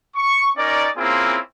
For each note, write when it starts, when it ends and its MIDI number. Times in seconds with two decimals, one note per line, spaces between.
0.16 0.49 85
0.57 0.87 61
0.57 0.87 63
0.57 0.87 70
0.57 0.87 74
0.97 1.37 58
0.97 1.37 60
0.97 1.37 61
0.97 1.37 64
0.97 1.37 65
0.97 1.37 68